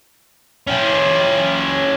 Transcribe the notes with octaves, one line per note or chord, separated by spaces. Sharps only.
C#4 G4